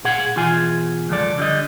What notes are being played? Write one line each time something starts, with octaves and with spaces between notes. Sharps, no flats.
A#2 G#4 F#5
B2 E3 F4 G#4 G#5
C#2 F#2 F3 A4 D5
D3 G3 D#5